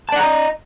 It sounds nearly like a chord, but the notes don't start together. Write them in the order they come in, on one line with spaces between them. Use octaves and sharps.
A5 D5 F#5 A#5 D#5